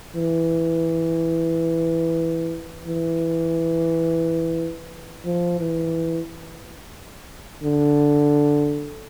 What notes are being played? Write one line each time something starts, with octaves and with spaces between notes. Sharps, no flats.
E3
E3
F3
E3
D3